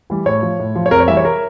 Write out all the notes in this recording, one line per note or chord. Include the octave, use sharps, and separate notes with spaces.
E3 G3
A2 C#5
F3
A2
F3
C#5
F2 A#4
C#5
E3 G3 E5
C#5
A#4